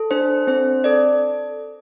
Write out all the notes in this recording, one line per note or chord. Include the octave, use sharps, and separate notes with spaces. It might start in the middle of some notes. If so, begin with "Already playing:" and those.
Already playing: A4
D4 C5
C4 C5
A4 D5